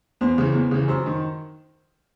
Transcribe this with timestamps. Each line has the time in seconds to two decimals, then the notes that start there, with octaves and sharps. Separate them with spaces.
0.21 E2 C5
0.38 C#3 E3
0.55 E2
0.71 C#3 E3
0.88 F#2 C5
1.06 D#3